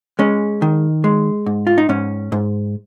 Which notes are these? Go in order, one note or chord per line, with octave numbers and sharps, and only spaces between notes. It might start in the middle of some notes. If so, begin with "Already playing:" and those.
G#3 C#4
D#3
G#3
G#2
F4
D#4
G#2 C#4
G#2